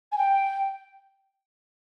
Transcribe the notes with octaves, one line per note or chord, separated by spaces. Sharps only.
G#5
G5